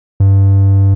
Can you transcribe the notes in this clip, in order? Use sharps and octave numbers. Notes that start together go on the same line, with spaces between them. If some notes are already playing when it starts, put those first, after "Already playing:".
G2